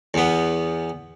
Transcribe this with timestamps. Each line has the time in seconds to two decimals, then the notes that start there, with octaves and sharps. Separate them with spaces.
0.14 E2 B3